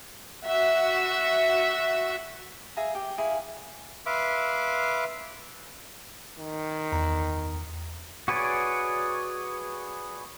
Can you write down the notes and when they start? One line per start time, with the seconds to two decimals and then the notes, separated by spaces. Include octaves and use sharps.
0.46 F#4 E5
2.76 G#4 E5 F5 A#5
2.95 G4
3.18 E4 G#4 C#5 F5
4.06 B4 E5 F5 C6 D6
6.38 D#3
6.92 E2 A#5
8.28 F#4 G#4 B4 C#5 D5